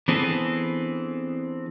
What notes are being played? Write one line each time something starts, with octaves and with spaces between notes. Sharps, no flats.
E3 B3 C4 D4 G#4 A4